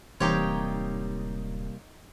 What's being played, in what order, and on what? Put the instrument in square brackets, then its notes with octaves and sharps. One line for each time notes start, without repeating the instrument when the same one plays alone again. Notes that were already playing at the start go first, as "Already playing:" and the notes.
[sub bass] D1 [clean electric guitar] C3 G3 A#3 [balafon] E3 [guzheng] D#4 G4 C#5